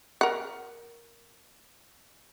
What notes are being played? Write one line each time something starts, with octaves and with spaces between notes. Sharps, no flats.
A#4 F#5